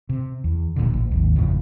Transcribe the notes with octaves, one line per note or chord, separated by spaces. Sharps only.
C3
E2
D#1 B1 A#2 D3
A1
G#1 D#2
G#1 F2 A2 C#3